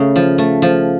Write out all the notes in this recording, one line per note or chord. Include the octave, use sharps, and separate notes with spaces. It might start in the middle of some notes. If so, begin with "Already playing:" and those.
Already playing: C#3 A3
F3
A3
F3